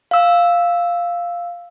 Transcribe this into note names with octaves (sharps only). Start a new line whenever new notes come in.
F5 E6